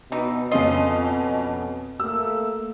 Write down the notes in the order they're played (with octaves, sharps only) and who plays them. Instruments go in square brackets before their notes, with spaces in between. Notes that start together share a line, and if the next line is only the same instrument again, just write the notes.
[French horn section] B2 [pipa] E3 D#4
[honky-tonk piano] F2 C#4 C7 [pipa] F4 D#5
[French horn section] A3 A#3 [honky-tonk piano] E6